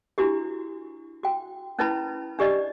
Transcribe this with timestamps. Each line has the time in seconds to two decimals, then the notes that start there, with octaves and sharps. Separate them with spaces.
0.18 D4 E4 F#4 G4
1.23 F#4 G5
1.79 C#4 D#4 E4 B4 A5 B5
2.39 D4 G4 D5 D#5